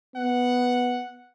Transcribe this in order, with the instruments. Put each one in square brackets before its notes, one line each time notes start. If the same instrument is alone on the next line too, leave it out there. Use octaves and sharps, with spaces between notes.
[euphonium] B3 [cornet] F#5